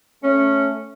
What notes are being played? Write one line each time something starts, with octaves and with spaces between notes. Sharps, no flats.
A3 C#4